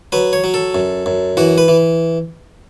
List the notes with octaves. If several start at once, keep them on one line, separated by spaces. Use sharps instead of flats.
F#3 B4
C#5
F#3
A4
F#2
F#2
E3 F#4
B4
E3